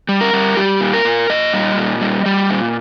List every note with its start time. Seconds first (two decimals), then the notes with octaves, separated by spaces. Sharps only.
0.09 G3
0.21 A#4
0.33 G3
0.57 G3 G4
0.81 A#2
0.94 A#4
1.05 A#2
1.30 A#2 D#5
1.53 G3
1.77 A#2
2.01 G3
2.26 G3
2.50 A#2